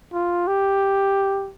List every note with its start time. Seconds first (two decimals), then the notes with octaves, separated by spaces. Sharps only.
0.13 F4
0.47 G4